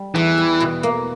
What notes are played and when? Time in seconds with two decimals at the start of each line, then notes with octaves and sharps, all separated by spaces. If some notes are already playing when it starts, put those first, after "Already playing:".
Already playing: G3
0.15 E2 E3
0.38 G3
0.60 B2
0.83 A#3